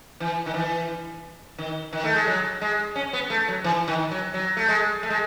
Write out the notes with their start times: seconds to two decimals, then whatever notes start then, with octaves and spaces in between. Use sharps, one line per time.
0.20 E3
0.46 D#3
0.54 E3
1.58 D#3
1.93 D#3
2.04 A3
2.15 G#3
2.27 F#3
2.61 G#3
2.96 C#4
3.13 B3
3.30 A3
3.48 F#3
3.64 E3
3.88 D#3
4.11 F#3
4.34 F#3
4.57 A3
4.68 G#3
5.03 A3
5.10 G#3